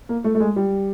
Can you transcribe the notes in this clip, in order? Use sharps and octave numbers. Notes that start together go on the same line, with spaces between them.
A#3
A3
A3
G#3
G3